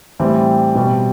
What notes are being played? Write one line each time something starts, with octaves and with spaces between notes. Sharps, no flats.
A2 E3 G3 C4
B2 G3